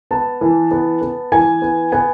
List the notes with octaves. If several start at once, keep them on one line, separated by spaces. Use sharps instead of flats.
B3 A5
E3
B3
B3
E3 G#5
B3
B3 G#5